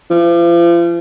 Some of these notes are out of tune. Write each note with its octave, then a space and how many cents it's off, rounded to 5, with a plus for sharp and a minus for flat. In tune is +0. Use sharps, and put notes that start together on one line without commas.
F3 -40